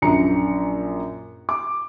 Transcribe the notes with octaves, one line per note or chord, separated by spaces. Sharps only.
A#1 F#2 D4 A#5 C#7
D6